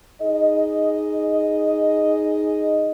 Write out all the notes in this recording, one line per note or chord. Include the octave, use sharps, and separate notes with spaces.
D#4 G#4 D#5